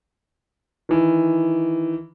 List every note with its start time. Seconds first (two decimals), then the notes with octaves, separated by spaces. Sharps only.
0.89 D#3 E3